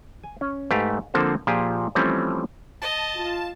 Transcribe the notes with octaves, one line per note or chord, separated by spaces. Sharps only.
G#5
C#4
G#2 A3 G4 B4 F5
D3 F3 A#3 C4 A4 C5
A#2 F3 G4 G#4
E3 F3 G3 A3 C4 C#4
D#5 A5
F4